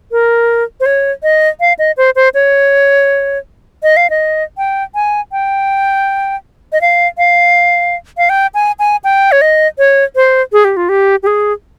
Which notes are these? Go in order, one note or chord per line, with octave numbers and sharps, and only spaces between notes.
A#4
C5
C#5
D#5
F5
D#5
C5
C5
C#5
D#5
F5
D#5
G5
G#5
G5
D#5
F5
F5
F5
G5
G#5
G#5
G5
C#5
D#5
C#5
C5
G#4
G4
F4
G4
G4
G#4